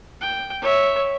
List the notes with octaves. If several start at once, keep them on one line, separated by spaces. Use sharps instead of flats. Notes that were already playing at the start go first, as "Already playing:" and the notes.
G5
C#5 E5